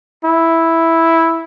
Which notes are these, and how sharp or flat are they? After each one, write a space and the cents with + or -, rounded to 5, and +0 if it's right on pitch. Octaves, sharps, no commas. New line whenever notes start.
E4 -5